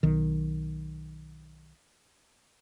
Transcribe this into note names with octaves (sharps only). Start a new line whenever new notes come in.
B1 D#3